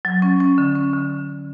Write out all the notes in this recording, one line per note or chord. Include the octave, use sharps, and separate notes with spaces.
F#3
C#4
C#4
D3
C#4
D3